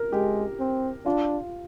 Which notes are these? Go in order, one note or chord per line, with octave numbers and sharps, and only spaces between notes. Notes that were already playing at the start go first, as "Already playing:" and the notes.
Already playing: A#4
G#3 G4
C4
D4 F4